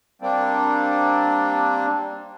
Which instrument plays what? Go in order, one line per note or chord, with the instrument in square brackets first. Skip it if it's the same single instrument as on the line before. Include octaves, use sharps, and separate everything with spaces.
[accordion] G3 A#3 C4 D4